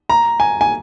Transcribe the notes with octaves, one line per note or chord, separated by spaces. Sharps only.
A#5
G#5
G#5